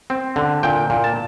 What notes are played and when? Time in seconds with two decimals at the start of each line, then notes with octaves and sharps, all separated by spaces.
0.10 C4
0.36 D3
0.63 A#2 G5
0.90 A#2
1.04 A5